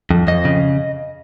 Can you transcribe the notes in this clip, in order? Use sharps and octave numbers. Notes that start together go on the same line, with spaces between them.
F2
F2 D#5
C#3